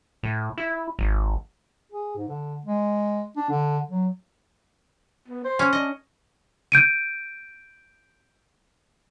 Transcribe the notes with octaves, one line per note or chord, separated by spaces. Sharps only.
A2
E4
G#1
G#4
G#2
D3
G#3
D4
D3
F#3
B3
C5
C#4
D4 D#5
G6 D7 D#7